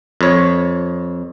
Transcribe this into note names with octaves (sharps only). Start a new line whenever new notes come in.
F2 C#5